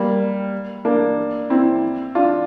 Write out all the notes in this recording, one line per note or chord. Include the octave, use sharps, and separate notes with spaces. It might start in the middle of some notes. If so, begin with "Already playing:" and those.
Already playing: G3 A#3
A#3 D4
C4 E4
D4 F4